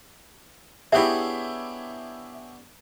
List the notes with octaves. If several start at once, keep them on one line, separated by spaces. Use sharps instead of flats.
B3 D4 E4 G4 G#4 C#5 E5